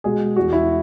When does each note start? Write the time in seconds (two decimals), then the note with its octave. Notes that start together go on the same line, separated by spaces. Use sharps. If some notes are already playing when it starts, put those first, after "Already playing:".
0.04 B2 G#3 G#4
0.36 E2 E3 G#3 F#4
0.53 E4